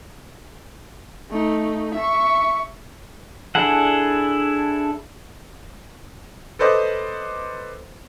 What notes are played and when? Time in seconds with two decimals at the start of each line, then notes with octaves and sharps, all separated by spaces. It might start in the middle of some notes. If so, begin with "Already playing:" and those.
1.31 A3 D#4
1.95 E5 C#6
3.55 D4 E4 G#4 A4 F#5
6.59 A4 B4 C5 D5 D#5